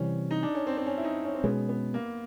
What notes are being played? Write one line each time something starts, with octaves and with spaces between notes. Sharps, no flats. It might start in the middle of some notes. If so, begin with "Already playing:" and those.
Already playing: C3 E3 G3 C4 C#4
D#4
D4
C#4
C4
C4
C#4
E4
D#4
C#4
C4
B2 G#3 B3 C#4
B3
A#3